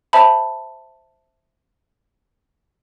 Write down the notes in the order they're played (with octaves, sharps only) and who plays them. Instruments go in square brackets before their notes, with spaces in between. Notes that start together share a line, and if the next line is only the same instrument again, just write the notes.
[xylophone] C5 E5 A5 B5